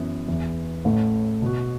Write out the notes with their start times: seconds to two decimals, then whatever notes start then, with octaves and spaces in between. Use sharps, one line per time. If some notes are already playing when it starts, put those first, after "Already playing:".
Already playing: F#2 E3 B3
0.27 E2 E3 B3
0.85 A1 A2 A3
1.42 B2 B3 F#4